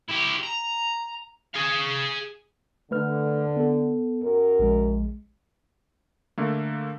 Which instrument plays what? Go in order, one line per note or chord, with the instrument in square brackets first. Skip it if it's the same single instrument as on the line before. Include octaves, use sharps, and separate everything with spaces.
[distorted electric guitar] E4 G4
A#5
G#4 F5
[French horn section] D3 [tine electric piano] A3 B4 F6
[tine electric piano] B3 A4
[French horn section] F#2 A#4
[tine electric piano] A#1 G#3
[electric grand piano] D3 A3 A#3